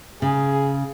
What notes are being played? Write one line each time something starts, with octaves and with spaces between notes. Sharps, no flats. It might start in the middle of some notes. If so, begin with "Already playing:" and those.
C#3 G#4